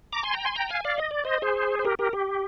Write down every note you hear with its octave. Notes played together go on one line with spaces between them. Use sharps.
A#5 D6
G#5 C6
G5 A#5
G#5 C6
G5 A#5
F5 G#5
D5 F5
D#5
D5
C5 D#5
G#4 C5
C5
G4 A#4
G4 A#4
G4